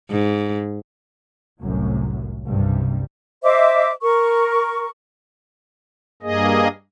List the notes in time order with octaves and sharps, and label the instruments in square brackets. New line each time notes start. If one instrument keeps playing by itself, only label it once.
[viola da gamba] G#2
[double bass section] F1 C2 F#2 A2 F#3
F#1 C2 G2 C3 G3
[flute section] C5 D#5 E5 D6
A#4 C#6
[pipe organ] G2 A#3 G#4 D#5